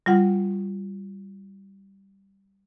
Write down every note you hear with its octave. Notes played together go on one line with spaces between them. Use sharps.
G3 F4 F#5